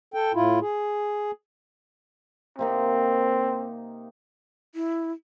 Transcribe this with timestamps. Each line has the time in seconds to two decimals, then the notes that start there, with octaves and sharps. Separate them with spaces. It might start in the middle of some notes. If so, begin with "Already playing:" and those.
0.14 A4 G5
0.34 A2 E4 F4
0.61 G#4
2.59 C3 A#3 C4 D#4
4.74 E4